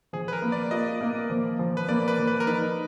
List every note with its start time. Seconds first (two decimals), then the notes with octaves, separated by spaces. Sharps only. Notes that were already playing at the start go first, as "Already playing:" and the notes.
0.13 F3 G#4
0.28 B4
0.33 A#4
0.42 A#3
0.52 D5
0.71 F4 D#5
1.01 A#3
1.30 F3
1.59 F3
1.77 B4
1.89 A#3 D5
2.08 B4
2.18 F3
2.27 B4
2.40 A#4
2.47 D#4 B4